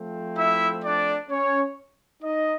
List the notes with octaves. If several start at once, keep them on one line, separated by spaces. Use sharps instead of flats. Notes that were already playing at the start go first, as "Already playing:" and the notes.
Already playing: F3 A3 C4
E4 E5
D4 D5
C#4 C#5
D#4 D#5